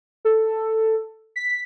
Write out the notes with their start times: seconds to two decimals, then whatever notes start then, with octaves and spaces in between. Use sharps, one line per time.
0.25 A4
1.36 B6